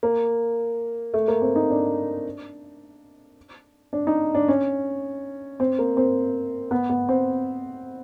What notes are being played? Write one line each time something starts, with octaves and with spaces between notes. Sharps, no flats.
A#3
A3
A#3
C4
D#4
D4
D4
D#4
D4
C#4
C4
A#3
C4
B3
B3
C4